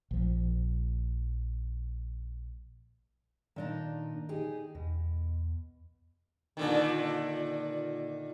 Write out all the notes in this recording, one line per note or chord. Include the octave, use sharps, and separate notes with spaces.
A#1 F3
A#2 D#3 D4 D#4
D#4 G4 G#4
E2 B2
A#2 D3 D#3